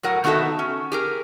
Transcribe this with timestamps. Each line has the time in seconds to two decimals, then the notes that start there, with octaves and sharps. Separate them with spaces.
0.03 A2 F#3 A#4 F#5
0.24 D#3 B3 D#4 F#4 A4 E5
0.59 C#4
0.92 G4 G#4 A#4